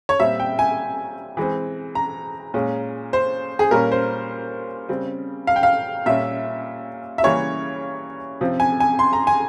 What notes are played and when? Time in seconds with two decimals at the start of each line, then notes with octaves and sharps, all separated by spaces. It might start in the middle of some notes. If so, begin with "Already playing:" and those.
0.09 C#5
0.19 A#2 G3 C4 E5
0.40 G5
0.59 G#5
1.37 E3 G#3 C4
1.95 A#5
2.54 A#2 G#3 C#4
3.13 C5
3.59 G#4
3.71 A#2 G3 C#4 A#4
3.92 C5
4.89 C#3 G3 C4
5.47 F5
5.56 G5
5.63 F5
6.06 A#2 G3 A#3 C#4 E5
7.18 E5
7.23 C#3 E3 G3 A#3 C#4 C#5
8.41 C3 F3 C4
8.60 G#5
8.80 G#5
8.99 C6
9.13 A#5
9.27 G#5